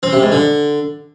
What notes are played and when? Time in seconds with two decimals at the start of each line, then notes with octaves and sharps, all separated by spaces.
0.03 C4
0.13 C3
0.22 G#2
0.32 D3